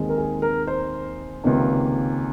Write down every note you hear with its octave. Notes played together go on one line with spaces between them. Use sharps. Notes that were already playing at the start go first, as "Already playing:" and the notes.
Already playing: D#2 D#3 G#3 C4
A#4
G#4
A#4
C5
C#2 C3 D#3 A#3 C#4